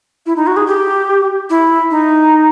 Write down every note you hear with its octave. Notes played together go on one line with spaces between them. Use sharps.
E4
D#4
F#4
G#4
G4
E4
D#4